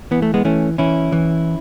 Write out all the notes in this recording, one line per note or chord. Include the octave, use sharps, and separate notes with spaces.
E3 B3
A3
G#3 B3
E3 A3 C#4
E3 C#4 E4
E3